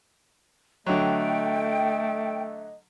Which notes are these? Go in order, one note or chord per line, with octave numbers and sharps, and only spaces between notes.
D3 F#3 A3 D#5 G5